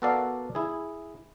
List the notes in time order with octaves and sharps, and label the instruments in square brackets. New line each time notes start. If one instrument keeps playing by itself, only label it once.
[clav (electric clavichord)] B3 F#4 A4 A#4 D5 F5
E4 G#4